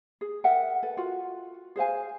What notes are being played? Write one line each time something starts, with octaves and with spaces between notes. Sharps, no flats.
G#4
A#4 E5 F#5 G5
A4 B4
F4 F#4 F#5
G#4 C5 F5 G#5